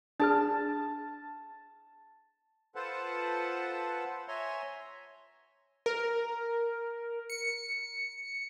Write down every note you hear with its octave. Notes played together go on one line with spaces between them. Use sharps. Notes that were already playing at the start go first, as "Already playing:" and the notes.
D4 G#4 A5 F6
F4 A4 B4 C5 F#5 A5
C#5 E5 G#5 A#5 C6
A#4
C#7